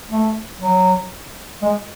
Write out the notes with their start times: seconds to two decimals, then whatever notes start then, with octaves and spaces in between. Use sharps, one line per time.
0.10 A3
0.60 F#3
1.62 G#3